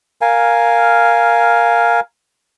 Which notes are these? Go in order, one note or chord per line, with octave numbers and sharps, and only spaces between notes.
A#4 F5 G#5